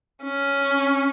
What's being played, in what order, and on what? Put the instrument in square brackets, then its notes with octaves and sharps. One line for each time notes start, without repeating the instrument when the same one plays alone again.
[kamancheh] C#4